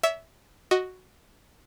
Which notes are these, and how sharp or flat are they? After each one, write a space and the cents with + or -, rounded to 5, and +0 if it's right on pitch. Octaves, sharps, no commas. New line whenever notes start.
C#5 +40 E5 -5
F#4 +0 D#5 +0